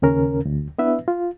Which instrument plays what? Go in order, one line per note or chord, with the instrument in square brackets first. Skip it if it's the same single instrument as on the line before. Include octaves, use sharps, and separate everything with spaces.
[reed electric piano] D#2 C#3 C#4 A#4
D2
B3 D4 E4 B4 E5
F4